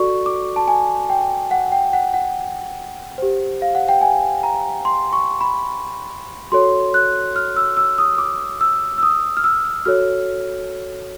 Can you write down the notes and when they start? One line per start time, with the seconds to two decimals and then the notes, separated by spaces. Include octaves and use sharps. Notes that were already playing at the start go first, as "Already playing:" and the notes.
Already playing: F#4 A4 D5 C#6
0.26 D6
0.56 A5
0.68 G#5
1.10 G5
1.51 F#5
1.72 G5
1.93 F#5
2.14 F#5
3.18 G4 C5
3.62 F5
3.75 F#5
3.88 G5
4.01 G#5
4.43 A#5
4.85 C6
5.13 C#6
5.41 B5
6.52 F#4 A4 C#5 C6
6.94 F#6
7.36 F6
7.56 E6
7.77 E6
7.98 D#6
8.18 D6
8.61 E6
8.98 E6
9.03 D#6
9.37 F6
9.44 E6
9.85 F#4 A4 C#5 F6